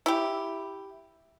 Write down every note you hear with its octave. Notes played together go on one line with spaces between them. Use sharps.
E4 G4